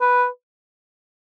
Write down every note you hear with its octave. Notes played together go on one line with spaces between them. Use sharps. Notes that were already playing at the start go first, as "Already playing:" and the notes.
B4